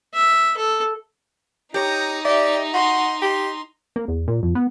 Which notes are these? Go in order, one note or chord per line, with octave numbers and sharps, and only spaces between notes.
E5
A4
D#4 G4 C#5 A#5 D#6
G4 D5 E5
F#4 D#5 C6
G4 C6
A#3
E2
A#2
F2
B3